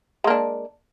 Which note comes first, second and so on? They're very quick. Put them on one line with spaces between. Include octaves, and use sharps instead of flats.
G#3 A#3 D4